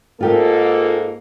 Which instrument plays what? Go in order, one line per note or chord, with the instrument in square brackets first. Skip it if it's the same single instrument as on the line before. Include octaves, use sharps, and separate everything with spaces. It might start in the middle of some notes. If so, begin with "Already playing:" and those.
[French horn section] G#2 A#3 A4 [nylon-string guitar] F4 G4 A#4